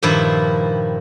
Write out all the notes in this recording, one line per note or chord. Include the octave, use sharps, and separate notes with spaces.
G2 A#2 D#3 F3 E4